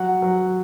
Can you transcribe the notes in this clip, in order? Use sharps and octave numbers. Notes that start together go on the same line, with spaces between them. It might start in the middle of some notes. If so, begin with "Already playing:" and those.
Already playing: F#3 F#5
F#3